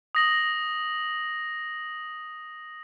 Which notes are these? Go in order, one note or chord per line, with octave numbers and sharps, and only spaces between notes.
D#6 A#6 F#7